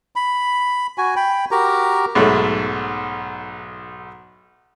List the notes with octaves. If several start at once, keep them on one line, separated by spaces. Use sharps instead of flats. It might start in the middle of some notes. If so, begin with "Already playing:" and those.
B5
F#4 G#5
G5 B5
F#4 G4 A#4 A#5
B1 G#2 A3